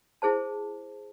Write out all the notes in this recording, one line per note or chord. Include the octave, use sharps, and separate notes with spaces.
E4 G#4 C5 A5